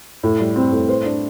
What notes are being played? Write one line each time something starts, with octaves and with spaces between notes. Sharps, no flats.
A2
G3
C4
A2
C5
D4